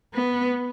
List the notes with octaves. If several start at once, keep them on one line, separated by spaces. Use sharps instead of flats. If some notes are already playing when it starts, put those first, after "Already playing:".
B3